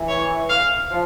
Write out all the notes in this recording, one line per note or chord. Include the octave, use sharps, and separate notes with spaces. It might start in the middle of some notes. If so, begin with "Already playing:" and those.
Already playing: E3
C#5
F5
F3